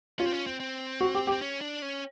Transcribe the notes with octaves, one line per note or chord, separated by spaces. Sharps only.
C#4 F4
C4
C#4
C4
C4
F#4
G4
G4
C4
C#4
D4
C#4